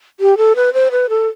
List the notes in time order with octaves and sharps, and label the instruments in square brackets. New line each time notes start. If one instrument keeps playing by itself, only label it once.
[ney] G4
A4
B4
C5
B4
A4